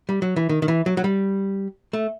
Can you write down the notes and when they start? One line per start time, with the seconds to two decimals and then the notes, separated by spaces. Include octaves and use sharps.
0.09 G3
0.22 F#3
0.36 E3
0.49 D#3
0.62 D#3
0.68 E3
0.86 F#3
0.97 F#3
1.04 G3
1.93 A3